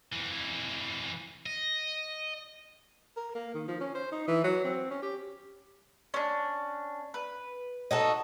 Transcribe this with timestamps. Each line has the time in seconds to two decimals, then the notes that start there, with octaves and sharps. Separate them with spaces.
0.12 F2 E3
1.46 D#5
3.17 A#4
3.35 A#3
3.55 D#3
3.68 F3
3.81 C#4
3.95 C5
4.12 D#4
4.28 E3
4.44 F#3
4.64 C4
4.91 C#4
5.02 G4
6.14 C#4 D4
7.14 B4
7.91 D#4 F#4 A4